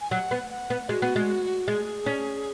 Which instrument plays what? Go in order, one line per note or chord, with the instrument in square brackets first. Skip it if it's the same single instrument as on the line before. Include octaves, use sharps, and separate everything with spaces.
[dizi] G#5
[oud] F#3 [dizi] F#5
[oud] B3
[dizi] F#5
[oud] B3
[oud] G#3 [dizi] F#4
[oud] B3
G#3
[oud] G#3 [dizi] G#4
[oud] C#4